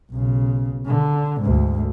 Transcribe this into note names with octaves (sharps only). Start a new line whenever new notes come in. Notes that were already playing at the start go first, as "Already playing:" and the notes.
B1 C#3
D3
D2 G#2